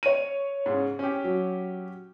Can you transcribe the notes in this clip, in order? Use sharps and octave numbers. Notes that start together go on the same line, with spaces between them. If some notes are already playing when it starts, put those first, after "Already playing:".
C#5 D#7
G#2 C#3
C#4 G4
F#3